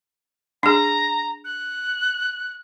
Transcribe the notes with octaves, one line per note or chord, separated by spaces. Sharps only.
D4 G#4 A#5
F#6